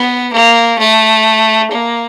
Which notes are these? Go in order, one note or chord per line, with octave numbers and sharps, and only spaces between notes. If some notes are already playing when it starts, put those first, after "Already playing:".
Already playing: B3
A#3
A3
A#3